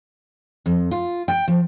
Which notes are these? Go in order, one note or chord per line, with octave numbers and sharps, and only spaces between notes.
F2
F4
G5
F3